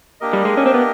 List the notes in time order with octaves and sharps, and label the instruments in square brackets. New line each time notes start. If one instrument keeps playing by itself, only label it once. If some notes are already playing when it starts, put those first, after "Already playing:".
[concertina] A#3 D4 G4 A#4 D#5
[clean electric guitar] G3
G#3
C#4
C4
B3